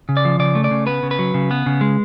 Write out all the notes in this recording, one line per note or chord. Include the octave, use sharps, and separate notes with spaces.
C#3
D5
F3
C#3 D5
A3
D5
C#3
B3 B4
C#3
B4
F#3
C#3
B3
C#3
G#3